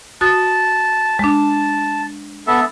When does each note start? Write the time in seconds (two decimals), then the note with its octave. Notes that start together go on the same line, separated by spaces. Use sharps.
0.21 F#4 A5 D#6 A6
1.19 G#3 D4 A5
2.47 B3 A4 E5